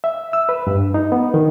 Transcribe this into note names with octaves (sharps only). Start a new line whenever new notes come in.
E5
E6
B4
G2
D#4
B3
D#3